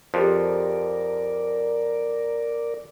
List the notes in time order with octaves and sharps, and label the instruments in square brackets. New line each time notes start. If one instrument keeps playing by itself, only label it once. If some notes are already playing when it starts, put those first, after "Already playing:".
[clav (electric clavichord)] F2 F3 [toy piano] G4 G#4 C5 [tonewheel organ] A#4 D5